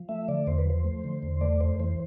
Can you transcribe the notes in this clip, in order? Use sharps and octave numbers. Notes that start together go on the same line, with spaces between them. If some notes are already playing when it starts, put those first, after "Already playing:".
Already playing: F3
A3 E5
D3 D5
E2 C5
B4
F3 C5
A3
D3
E2
A3 D5
F2 C5
E3 C5